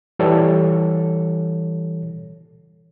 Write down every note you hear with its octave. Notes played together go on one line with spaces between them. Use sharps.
E3 G3 A4 C#5